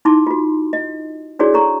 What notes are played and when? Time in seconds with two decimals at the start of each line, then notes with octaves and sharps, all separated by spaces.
0.05 D#4 E4 A5 C6 D6
0.27 F4 F#4
0.73 D#5
1.39 D4 E4 F#4 G#4 C#5 D5
1.54 A4 C#5 A#5 C#6